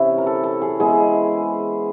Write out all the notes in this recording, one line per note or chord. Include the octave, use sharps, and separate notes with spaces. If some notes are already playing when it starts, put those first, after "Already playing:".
Already playing: C3 E3 C#4 E4
A#4
A4
A4
G#4
E3 G#3 B3 G#4